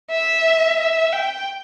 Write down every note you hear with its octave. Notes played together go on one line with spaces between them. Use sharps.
E5
E5
G5